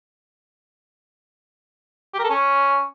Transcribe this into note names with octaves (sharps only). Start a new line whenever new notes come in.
G4
A#4
A4
C#4